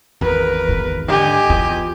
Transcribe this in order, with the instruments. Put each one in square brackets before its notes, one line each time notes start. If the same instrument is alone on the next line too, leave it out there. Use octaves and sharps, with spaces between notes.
[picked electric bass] G#1 E2 [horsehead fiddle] A#4 B4
[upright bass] G#2
[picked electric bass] D3 D#3 [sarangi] G4 [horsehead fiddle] D#5 G#5
[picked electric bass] E2 [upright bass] F4